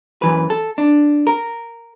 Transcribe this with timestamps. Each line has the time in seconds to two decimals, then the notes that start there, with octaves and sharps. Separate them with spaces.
0.22 F#2 E3 B4
0.50 A4
0.78 D4
1.27 A#4